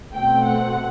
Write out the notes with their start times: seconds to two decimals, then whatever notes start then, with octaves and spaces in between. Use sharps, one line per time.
0.13 B2 A3 C4 G5
0.45 F#5